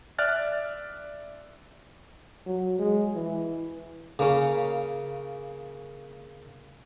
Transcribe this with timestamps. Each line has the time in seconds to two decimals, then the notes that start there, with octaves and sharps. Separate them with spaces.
0.19 D5 E5 F6 F#6 A6
2.46 F#3
2.79 G#3
3.15 E3
4.19 C#3 A#3 C#4